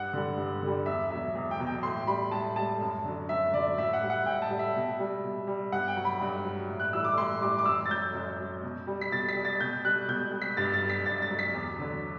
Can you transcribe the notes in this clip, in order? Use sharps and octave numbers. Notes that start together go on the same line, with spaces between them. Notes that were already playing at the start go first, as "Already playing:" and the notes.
Already playing: G2 F#5
D3 G3
G2
D3 G3
E2 E5
B2 F#3 E5
E2
G5
B2 F#3
G5
A2 C6
G3 B5
A2 A5
G3 A5
F#2
D3 F#3
F#2 E5
D3 F#3 D5
A2 E5
F#5
G3
F#5
A2 G5
A5
G3
E5
B2
G3
B2
G3
G2 F#5
G5
F#3
B5
G2
F#3
A2
F#6
E3 G3 E6
D6
A2 C6
E3 G3 D6
D6
F#2 E6
A6
F#3 G6
F#2
F#3
B2
G3
B6
B2 A6
B6
G3
A6
B2 G6
G3 F#6
B2 G6
G3
B6
G2 A6
A6
F#3
B6
G2 A6
A6
F#3
B6
E2
D3 F#3